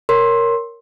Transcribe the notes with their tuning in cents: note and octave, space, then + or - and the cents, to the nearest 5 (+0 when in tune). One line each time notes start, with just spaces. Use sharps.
A#4 +0 C#5 +0 C6 +15